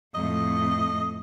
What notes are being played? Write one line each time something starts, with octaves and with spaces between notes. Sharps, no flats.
F2 A2 D#5